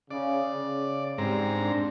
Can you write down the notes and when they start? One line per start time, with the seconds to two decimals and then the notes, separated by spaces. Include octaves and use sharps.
0.11 C#3 D5
0.54 C#3
1.18 G#2 G3 C4 A#5
1.51 D4